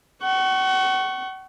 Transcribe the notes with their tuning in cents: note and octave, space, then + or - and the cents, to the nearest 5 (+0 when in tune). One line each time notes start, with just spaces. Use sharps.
F#5 +40 C#6 +0